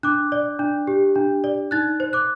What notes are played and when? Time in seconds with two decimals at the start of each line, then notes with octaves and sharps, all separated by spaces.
0.03 D4 D6 F#6
0.32 D5
0.59 D4
0.87 G4
1.15 D4
1.44 D5
1.71 D#4 F#6 A6
2.00 C5
2.13 D6 F#6